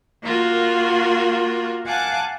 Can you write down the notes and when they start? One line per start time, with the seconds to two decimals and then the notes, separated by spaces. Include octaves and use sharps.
0.23 A#3 F4 F#4 A#4
1.86 F5 F#5 G#5 A5 D6 F#6